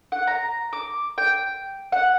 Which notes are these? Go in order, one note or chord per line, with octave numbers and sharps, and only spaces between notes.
F#5
A#5
D6
G5
F#5